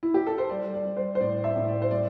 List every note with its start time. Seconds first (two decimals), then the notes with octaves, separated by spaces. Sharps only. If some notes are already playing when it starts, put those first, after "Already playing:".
0.03 E4
0.14 G4
0.26 A4
0.38 C5
0.50 G3 D5
0.74 D5
0.85 G3
0.97 C5
1.15 C5
1.20 A2 D5
1.44 E5
1.56 A2
1.68 D5
1.82 C5
1.91 G3 D5